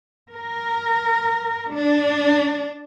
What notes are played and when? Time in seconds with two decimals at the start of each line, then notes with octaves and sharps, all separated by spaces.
0.33 A#4
1.71 D4